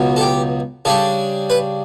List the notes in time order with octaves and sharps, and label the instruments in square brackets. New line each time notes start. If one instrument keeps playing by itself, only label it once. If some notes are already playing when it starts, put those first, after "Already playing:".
Already playing: [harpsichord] C#2 B2 F#3 B3
A4
G4
C#3 G3 D4 A4
B4